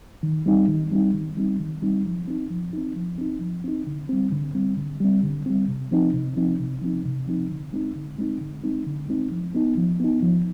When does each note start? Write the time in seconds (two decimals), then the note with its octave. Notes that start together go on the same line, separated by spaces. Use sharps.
0.23 D#3
0.46 G3 C4 D#4
0.68 D#3
0.91 G3 C4 D#4
1.14 D#3
1.37 G3 C4 D#4
1.60 D#3
1.82 G3 C4 D#4
2.05 F3
2.28 C4 D#4
2.50 F3
2.73 C4 D#4
2.96 F3
3.18 C4 D#4
3.41 F3
3.64 C4 D#4
3.87 D3
4.09 G3 C4
4.32 D3
4.55 G3 C4
4.77 D3
5.00 G3 C4
5.23 D3
5.46 G3 C4
5.68 C3
5.91 F3 C4 D#4
6.14 C3
6.36 F3 C4 D#4
6.59 C3
6.81 F3 C4 D#4
7.05 C3
7.28 F3 C4 D#4
7.50 D3
7.73 G#3 C4 D#4
7.96 D3
8.18 G#3 C4 D#4
8.41 D3
8.64 G#3 C4 D#4
8.86 D3
9.09 G#3 C4 D#4
9.31 F3
9.55 B3 D#4
9.77 F3
10.00 B3 D#4
10.23 F3